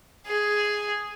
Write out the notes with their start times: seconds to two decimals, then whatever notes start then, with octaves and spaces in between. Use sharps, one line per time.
0.27 G#4